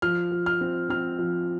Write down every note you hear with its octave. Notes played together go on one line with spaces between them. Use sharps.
F3 F6
F3
F6
C4
C4 F6
F3